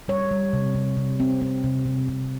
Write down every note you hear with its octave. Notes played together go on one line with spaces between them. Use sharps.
G3 C#5
G3
C3
C3
C3
C4
C4
C3
C3
C3